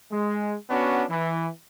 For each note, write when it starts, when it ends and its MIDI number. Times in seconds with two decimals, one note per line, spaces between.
0.11 0.55 56
0.70 1.04 59
0.70 1.04 61
0.70 1.04 62
0.70 1.04 66
1.10 1.47 52